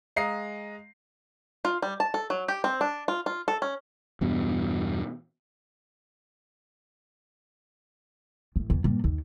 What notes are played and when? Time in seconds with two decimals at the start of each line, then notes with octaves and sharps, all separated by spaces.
0.16 G#3 D#5 F5 A#5 C7
1.65 F4
1.82 G3
2.00 A5
2.14 A4
2.30 F#3
2.48 G4
2.64 C4
2.81 D4
3.08 F4
3.26 F4
3.48 A4
3.62 C#4
4.21 E2 G2 B2
8.56 A1
8.70 E2
8.84 G2 A#2
9.04 D#2